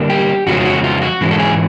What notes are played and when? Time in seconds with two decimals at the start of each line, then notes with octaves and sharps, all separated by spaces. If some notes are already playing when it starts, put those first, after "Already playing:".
Already playing: D3 G3 A#3 D4
0.10 G4
0.46 F2 C#3 F3 G#3 C#4 F#4
0.60 F4
0.65 F#4
0.84 F4
1.02 F#4
1.21 G#2 E3 G#3 C#4
1.31 A4
1.39 G#4